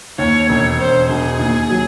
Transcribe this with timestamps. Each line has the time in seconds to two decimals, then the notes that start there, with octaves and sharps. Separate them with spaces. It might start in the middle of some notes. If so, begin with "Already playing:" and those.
0.18 D#2 C#5
0.49 E1 C#5
0.79 E1 C5
1.09 E1 G#4
1.39 D#2
1.70 F#3